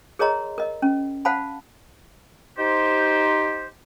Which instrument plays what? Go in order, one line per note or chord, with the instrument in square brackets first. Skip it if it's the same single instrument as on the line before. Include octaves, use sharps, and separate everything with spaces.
[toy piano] G#4 A#4 C#5 D#5 A#5 C6
A#4 D#5
C#4
C5 F5 F#5 A5 B5
[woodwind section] D#4 G4 C5